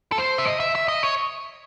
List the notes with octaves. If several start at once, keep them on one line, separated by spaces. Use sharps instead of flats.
A4
C5
E5
D#5
E5
E5
D#5
C#5